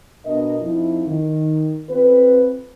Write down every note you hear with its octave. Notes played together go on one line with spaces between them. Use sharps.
B2 D4 A#4 D#5
F2 F3 D#4 E4
D#3
C4 F4 A4 B4